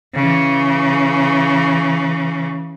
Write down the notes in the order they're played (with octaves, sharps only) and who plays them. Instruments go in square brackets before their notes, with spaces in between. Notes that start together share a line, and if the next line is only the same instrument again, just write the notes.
[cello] C#3 E3